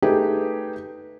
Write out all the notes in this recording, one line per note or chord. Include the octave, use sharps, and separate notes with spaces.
A3 D#4 G4 G#4 B4